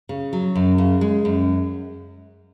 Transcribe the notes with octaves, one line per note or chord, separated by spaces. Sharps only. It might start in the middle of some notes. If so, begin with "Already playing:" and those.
C#3
F#3
F#2
C#3
G#3
F#2